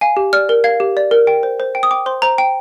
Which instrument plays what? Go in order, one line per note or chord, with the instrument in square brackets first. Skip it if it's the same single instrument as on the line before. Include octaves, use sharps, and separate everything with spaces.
[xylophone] F5 G#5
G4
D5 F6
A#4
F5 G#6
G4
D5
A#4
G5
C5
C5
G5
D#6
G5 D6
C5 C6
C5 A#5
G5